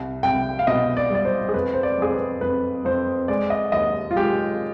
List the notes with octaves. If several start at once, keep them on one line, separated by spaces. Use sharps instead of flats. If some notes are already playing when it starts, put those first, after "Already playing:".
Already playing: C2
C2 G5
F5
B2 D#5
D5
G3 D5
C5
G#4
F2 B4
C5
D5
F2 G#4
B4
F2 B4
F2 C5
G#3 D5
D#5
D#2 D#5
F4
G#3 G4